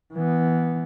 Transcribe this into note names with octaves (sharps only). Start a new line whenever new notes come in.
E3 B3